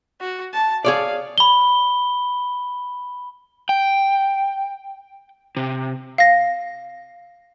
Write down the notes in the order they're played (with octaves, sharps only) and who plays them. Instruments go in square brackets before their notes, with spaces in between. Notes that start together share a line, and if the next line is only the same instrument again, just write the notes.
[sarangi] F#4
A5
[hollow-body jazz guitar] G#4 C#5 D5 [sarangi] F5
[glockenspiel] B5 G7
[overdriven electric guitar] G5
C3
[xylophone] F5 A#6